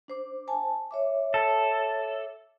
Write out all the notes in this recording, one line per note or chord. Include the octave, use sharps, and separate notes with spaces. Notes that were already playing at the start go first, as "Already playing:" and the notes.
D4 C5 D6
C5 G#5 A5
C#5 E5 D6
A4